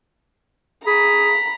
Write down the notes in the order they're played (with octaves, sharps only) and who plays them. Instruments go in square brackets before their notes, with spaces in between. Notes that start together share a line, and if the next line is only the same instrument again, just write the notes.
[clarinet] G#4 [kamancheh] A#5 [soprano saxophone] B5